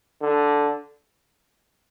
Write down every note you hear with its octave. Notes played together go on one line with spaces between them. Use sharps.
D3